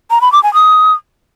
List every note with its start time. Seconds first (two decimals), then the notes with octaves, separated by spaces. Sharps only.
0.11 A#5
0.21 B5
0.32 D6
0.43 G#5
0.54 D#6